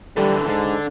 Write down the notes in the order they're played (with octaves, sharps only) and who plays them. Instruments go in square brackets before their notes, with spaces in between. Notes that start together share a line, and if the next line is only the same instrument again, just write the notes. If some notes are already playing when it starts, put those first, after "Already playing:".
[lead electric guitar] D3 E3 [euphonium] G3 [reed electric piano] A4
[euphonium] G#2 [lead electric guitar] D3 D4